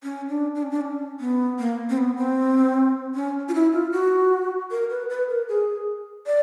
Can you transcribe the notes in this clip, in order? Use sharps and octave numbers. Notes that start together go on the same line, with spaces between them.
C#4
D4
D4
C#4
D4
C#4
B3
A#3
C4
B3
C4
C#4
F4
E4
F4
F#4
A#4
B4
B4
A#4
G#4
D5